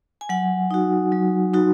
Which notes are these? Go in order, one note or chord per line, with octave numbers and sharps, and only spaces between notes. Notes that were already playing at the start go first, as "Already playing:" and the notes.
G#5
F#3 F#5
D#4 F#4
F#3
D#4 F#4